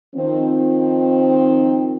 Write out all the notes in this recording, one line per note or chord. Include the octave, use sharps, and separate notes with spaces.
D#3 F3 C4